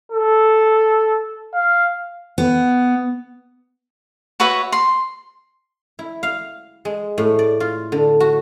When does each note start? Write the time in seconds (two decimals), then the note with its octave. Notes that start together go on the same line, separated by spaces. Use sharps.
0.12 A4
1.53 F5
2.38 B3
4.40 F#4 B4 C#5 E5
4.72 C6
5.99 E4
6.23 F5
6.85 G#3
7.18 A2
7.39 D5
7.60 F4
7.92 D3
8.20 F#4